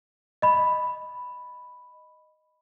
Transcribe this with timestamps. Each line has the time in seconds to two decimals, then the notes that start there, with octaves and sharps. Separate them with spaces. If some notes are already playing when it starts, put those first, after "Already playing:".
0.42 D#5 B5